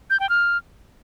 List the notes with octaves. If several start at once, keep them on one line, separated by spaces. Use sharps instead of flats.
G6
G5
F6